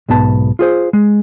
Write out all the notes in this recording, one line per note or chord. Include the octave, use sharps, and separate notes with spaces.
B1 G#2 B3 A5
F4 G#4 C5
G#3